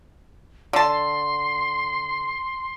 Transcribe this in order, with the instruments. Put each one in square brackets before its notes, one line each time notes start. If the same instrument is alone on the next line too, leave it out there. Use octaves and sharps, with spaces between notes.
[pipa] D3 A5 [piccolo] C6